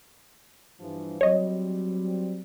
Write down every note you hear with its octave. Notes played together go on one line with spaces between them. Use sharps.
G2 E3 F3
F#3 G3 C4 C#5 D#5